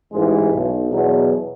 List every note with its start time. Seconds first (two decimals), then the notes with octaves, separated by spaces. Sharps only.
0.13 A1 G#2 E3 G#3
0.53 B1 B2
0.92 E2 B2 F#3